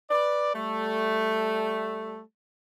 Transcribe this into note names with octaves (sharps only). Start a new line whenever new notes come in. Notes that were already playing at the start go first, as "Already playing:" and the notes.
B4 D5
G3 A3